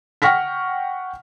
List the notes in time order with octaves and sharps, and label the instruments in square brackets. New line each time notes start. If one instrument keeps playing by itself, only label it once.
[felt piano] F#5 G5 C#6 F6 A#6 B6